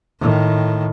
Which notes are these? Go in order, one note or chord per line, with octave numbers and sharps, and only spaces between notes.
A2 D#3